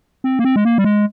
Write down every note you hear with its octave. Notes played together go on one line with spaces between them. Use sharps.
C4
A#3
C4
G#3
A#3
G3
G#3